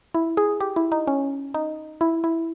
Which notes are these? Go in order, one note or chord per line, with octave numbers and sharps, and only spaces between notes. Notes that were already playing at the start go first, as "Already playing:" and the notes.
E4
G#4
G4
E4
D#4
C#4
D#4
E4
E4